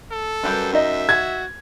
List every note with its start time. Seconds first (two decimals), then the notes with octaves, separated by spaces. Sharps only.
0.11 A4
0.43 F#2 G3 G4 B4
0.73 D#4 D#5 E5
1.09 F#4 G#6